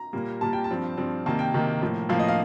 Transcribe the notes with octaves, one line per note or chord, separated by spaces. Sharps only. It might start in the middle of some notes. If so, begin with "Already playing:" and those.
Already playing: A#5
A#2 G3 A#3
A#2 G3 A#3 A5
G5
A5
G2 F3 C4
G2 F3 C4
C3 D#3 A#3 A5
G5
C3 D#3 A#3
A2 F3 A#3
A2 F3 A#3 F5
D#5
F5